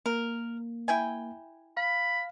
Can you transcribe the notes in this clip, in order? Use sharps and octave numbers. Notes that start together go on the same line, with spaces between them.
A#3 A#4
E4 G5 G#5
F5 B5